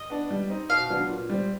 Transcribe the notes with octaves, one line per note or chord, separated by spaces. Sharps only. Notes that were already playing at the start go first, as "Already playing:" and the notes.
Already playing: D#5
B3 D4
G3
C4 D#4
B2 F5
F#3 B3 D4
A#2
G3 C4